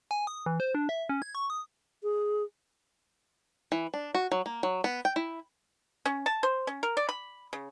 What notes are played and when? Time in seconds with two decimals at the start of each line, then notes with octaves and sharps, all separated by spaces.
0.11 G#5
0.27 D#6
0.46 E3
0.60 C5
0.75 D4
0.89 E5
1.09 C#4
1.22 G#6
1.35 C#6
1.50 D#6
2.03 G#4
3.72 E3
3.94 D4
4.14 F#4
4.32 F#3
4.46 A#3
4.63 F#3
4.84 B3
5.05 G5
5.16 E4
6.06 C#4
6.26 A5
6.43 C5
6.67 C#4
6.83 A#4
6.97 D5
7.09 B5
7.53 C#3